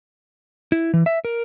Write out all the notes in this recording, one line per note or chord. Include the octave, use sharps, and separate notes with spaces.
E4
E3
E5
A#4